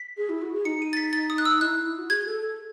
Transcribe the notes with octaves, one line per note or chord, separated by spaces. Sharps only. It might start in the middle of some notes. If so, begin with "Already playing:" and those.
Already playing: B6
G#4
E4
F#4
G#4
D#4 C#7
D#7
A6
B6
A6
D#6
F#6
E6
E4 F#6
E4
F#4
G#4 G#6
A4
A4